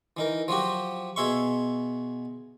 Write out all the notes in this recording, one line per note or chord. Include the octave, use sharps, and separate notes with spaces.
E3 D#4 A#4
F3 F#3 F#4 G4
B2 G#4 E5 C6 C#6